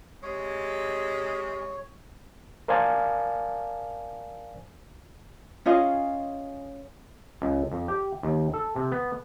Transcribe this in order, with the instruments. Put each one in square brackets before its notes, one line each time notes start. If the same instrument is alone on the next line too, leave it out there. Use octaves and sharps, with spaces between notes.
[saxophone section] C3 G#3 [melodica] C#5
[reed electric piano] A#4 C5 D5 F5 G#5 A5
[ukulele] C#4 F4 G#4 D#5
[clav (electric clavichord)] C#2
F2
G4
D#2
A4
C3
B3